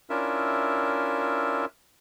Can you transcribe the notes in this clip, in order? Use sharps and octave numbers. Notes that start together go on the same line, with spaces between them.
C#4 D4 E4 F4 A#4 E5